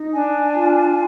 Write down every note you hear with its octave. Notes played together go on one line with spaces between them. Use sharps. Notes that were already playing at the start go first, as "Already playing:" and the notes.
Already playing: D#4
D4 G#5
F4